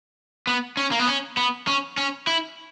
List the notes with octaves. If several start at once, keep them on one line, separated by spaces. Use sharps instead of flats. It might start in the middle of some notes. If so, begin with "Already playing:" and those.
B3
C#4
A#3
B3
C#4
B3
C#4
C#4
E4